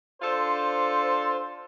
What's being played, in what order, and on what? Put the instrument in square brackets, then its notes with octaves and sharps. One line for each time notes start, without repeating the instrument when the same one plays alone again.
[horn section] D4 F4 A4 C5